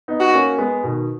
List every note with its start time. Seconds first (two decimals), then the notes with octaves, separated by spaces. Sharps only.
0.08 B3 D#4
0.20 F#4
0.33 A#3 C#4
0.58 G#3 B3
0.84 B2 D#3